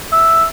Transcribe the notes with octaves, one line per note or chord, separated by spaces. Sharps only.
E5